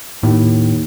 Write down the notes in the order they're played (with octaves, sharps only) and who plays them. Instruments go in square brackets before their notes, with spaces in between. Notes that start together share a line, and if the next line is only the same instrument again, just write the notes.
[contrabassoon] D#2 [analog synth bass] A2